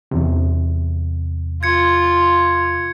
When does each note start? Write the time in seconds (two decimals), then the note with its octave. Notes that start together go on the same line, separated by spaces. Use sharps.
0.11 E2 C3
1.63 F4 G#6 C#7